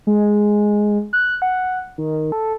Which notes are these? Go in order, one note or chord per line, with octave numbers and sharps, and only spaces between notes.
G#3
F#6
F#5
D#3
A4